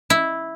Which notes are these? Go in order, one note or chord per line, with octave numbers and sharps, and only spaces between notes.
E4